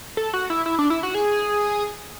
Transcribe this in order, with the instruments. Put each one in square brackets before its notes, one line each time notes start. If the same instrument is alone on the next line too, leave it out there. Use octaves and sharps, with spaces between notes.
[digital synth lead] A4
F#4
E4
E4
D4
E4
F#4
G#4